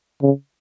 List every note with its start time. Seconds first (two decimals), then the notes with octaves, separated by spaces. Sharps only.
0.22 C#3